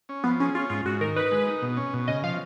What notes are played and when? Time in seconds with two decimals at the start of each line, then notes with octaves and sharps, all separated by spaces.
0.09 C#4
0.24 F3 B3
0.40 C#4 G#4
0.55 C#4 F4
0.70 G#2 F4
0.86 G#2 F#4
1.01 D#3 A#4
1.16 D#4 B4
1.31 G#3
1.47 D#4
1.62 B2
1.77 C#4
1.94 B2
2.08 C#3 D#5
2.24 F3 F5